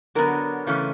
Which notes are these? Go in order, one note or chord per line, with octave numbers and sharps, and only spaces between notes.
D3 F#3 B3 A#4
C#3 E3 A3 C#4